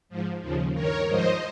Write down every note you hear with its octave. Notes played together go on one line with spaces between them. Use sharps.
G#2 F3
D#2 C#3 F3
G2 D#3 A#4 C#5
G#2 F3 C5 D#5